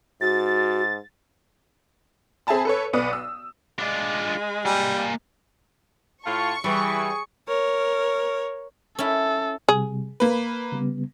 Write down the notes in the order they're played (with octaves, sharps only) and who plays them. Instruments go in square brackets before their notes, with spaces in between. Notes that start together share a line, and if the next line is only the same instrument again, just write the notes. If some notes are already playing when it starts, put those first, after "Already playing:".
[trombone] G#2 [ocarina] F#4 [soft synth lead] A6
[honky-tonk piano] C4 G#4 E5 G#5 A5 B5
A4 B4 C#5
B1 B3 D5 D#6
E6
[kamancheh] G#3 [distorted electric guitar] D4 F4
[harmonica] G3 [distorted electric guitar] A#3 G#5
[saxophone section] A2 F4 [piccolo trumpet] A5 [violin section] C#6
[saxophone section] E3 [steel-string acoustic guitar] G3 [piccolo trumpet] G#4
[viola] A#4 C#5
[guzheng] C#4 E4 [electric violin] A4
[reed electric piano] C3 G3 [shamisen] G#4
[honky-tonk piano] A#3 B4 [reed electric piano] B5
[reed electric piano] C#3 G3 B3